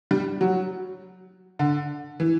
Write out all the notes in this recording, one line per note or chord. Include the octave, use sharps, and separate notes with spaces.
G3
F#3
D3
E3